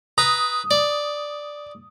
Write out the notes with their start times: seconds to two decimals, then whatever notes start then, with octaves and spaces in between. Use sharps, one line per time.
0.18 B4 A#5 D#6
0.71 D5